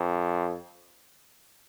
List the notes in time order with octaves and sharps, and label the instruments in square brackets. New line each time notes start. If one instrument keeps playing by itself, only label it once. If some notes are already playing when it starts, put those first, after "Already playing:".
Already playing: [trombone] F2